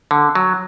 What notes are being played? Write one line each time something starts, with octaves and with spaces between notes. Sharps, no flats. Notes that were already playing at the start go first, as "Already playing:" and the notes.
D3
F#3